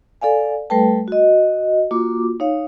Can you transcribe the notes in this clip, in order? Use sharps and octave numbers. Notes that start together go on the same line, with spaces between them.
A4 D5 F5 G#5
G3 A3 A4 B4 G5 A5
F#4 D#5
A#3 F4 F#4 D6
D#4 C#5 F5